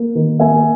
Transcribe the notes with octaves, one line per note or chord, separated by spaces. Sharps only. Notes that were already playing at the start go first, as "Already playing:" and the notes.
Already playing: A#3
D#3
A#3 E5 G#5